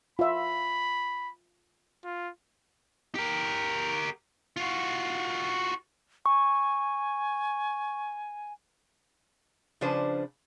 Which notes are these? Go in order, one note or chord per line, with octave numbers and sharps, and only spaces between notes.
F4 E5 B5
F4
G4 A#4
F4 F#4
G#5 C#6
C#3 F3 D4 B4 C5